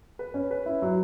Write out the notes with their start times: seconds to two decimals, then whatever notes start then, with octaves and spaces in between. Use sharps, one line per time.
0.19 B4
0.34 C#4
0.51 B4
0.66 E4
0.82 F#3